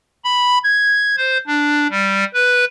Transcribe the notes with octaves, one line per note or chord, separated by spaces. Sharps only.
B5
G#6
C5
D4
G3
B4